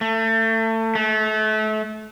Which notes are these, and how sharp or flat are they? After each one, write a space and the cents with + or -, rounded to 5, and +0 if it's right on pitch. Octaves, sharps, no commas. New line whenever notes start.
A3 +30
A3 -30